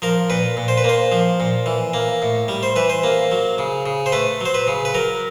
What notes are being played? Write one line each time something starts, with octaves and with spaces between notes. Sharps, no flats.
F3 A#4
A#2 B4
A#2
C5
B4
A#3 C5
F3
A#2
E3
A#3
A2
G3
C5
E3 B4
C5
A#3
F#3
C#3
C#3
C5
A3 B4
F#3 C5
B4
C#3
B4
F#3 A#4